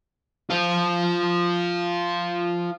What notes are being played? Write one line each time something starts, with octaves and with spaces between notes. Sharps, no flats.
F4 C5